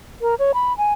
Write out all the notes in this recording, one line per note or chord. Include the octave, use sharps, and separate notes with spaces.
A#4
C#5
B5
G#5